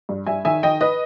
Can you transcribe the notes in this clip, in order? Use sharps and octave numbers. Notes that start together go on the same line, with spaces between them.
G2
G2 E5 G#5
D#3 E5 G#5
D#3 D#5 G5
B4 D#5